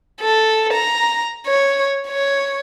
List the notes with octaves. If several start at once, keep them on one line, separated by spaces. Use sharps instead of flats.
A4
A#5
C#5
C#5